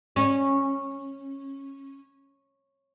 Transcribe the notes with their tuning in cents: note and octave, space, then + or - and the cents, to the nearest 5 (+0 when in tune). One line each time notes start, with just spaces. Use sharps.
C#4 -15